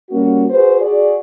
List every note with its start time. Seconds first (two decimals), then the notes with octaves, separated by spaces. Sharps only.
0.11 G3 A#3 C#4 F#4
0.50 F#4 G#4 B4 C5
0.81 F#4 G#4 D5